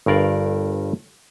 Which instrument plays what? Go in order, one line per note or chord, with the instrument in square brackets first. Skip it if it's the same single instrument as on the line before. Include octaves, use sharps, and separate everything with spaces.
[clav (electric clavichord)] G1 G2 A#4 D5 F5